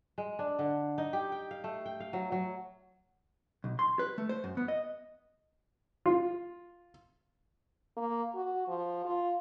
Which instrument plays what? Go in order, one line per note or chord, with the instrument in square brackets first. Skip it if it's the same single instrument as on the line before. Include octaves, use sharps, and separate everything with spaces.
[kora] G#3
D4
D3
D#4
G4
G5
F5
A3
G5
F5
F#3
F#3
[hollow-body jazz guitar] B1
C6
B4
A3
C5
F#2
B3
D#5
[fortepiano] F4
[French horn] A#3
F#4
F3
F4